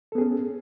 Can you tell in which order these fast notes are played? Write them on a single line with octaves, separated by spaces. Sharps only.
A4 B3 G#4 C#4